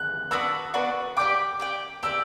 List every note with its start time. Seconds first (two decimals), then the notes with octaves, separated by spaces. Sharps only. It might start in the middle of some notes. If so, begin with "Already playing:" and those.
Already playing: F#6
0.31 B3 D4 F#4 B4 E6
0.74 B3 D4 F#4 B4
1.17 G4 D5 G5 D6
1.60 G4 D5 G5
2.03 G4 D5 G5 E6